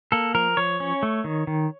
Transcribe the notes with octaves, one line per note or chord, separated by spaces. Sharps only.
A#3 A4
F3 A#4
F3 C#5
C#4
A3
D#3
D#3